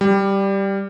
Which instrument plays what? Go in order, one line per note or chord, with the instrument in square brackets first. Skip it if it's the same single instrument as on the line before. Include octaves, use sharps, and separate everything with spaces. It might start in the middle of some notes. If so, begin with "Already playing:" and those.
[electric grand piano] G3